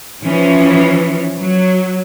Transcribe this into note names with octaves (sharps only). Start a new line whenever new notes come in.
E3 F3 C#4
F#3